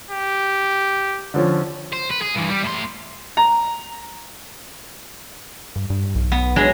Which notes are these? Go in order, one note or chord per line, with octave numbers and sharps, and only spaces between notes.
G4
D3 F3 C#4
C5
B4
G#4
G2 E3
G3
A2 C6
A#5
G2
G2
B1
B3
F#3 G#3 D4 A#5